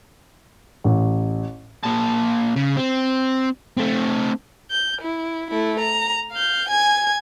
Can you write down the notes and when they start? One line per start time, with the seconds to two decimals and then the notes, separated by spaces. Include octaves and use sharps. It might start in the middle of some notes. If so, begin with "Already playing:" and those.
0.84 A1
1.83 A#2 A5
2.56 C#3
2.77 C4
3.77 A3 C4
4.71 G6
5.01 E4
5.50 A3 E4
5.79 A#5
6.32 F5 G6
6.69 G#5 G#6